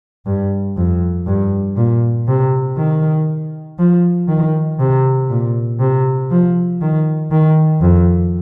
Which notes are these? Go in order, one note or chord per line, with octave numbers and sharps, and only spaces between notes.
G2
F2
G2
A#2
C3
D#3
F3
D#3
C3
A#2
C3
F3
D#3
D#3
F2